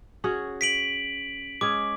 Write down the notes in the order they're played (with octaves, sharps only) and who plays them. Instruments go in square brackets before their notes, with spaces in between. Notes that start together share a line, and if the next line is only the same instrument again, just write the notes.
[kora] C#4 F#4 G#4
[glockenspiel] B6 D7 F#7
[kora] G#3 C#4 G#4 [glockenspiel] D6